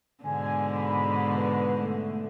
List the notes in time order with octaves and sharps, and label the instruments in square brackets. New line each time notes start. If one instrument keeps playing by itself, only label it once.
[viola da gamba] G#2 B2 D3 [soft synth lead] G#5
[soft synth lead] B5
B4
A3